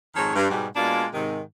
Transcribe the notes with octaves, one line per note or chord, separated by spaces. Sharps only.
F2 G#2 D#3 A4 C#5
G2
G#2 B2 G3
B2 G#3 A#3 D4 F4 D5
G#2 C3 D#3